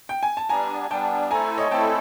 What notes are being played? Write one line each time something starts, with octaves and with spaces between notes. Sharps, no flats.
G5
G#5
A5
G3 B3 D4 G#5 A#5
G3 B3 D4 G5 A5
A3 C4 E4 A4 G#5 A#5
C#5 D#5
A3 C4 E4 A4 G5 A5